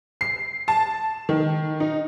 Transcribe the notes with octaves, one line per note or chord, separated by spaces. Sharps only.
C7
A5
D#3
D#4